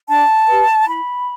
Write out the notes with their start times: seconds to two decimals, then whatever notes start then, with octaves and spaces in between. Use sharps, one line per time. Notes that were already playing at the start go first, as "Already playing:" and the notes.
0.10 D4 A5
0.48 G4 B4
0.87 E4 B5